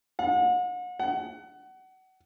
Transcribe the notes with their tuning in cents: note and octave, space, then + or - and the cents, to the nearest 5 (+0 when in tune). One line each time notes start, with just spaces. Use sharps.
F#5 -40
F#5 +25